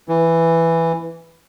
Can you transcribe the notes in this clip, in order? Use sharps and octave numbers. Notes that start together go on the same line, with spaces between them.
E3